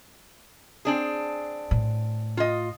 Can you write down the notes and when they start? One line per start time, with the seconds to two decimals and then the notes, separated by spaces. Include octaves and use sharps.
0.85 C4 D4 G#4
1.71 A2
2.37 F4 D#5